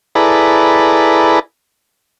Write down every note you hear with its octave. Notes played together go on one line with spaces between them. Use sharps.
E4 G#4 A4 B4 D5 A#5